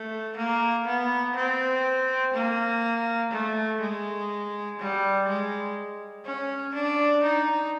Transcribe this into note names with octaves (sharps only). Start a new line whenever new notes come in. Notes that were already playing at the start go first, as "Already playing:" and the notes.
Already playing: A3
A#3
B3
C4
A#3
A3
G#3
G3
G#3
C#4
D4
D#4